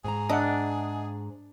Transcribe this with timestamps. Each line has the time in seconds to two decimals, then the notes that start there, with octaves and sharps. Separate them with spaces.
0.04 G#2 G#4 G#5 A#5
0.29 D4 D#5 E5 F#5